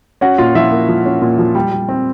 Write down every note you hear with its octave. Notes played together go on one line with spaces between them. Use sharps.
C#4 F#4 F#5
A#2 F4 F5
F3 E4 E5
A#3
F3
C#4
A#2
F3
G3
G3
C4